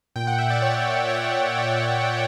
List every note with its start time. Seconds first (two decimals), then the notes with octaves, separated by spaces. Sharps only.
0.16 A#2 G5
0.27 F#5
0.39 E5
0.50 D5
0.62 C#5
0.85 D5
1.09 C#5
1.55 D5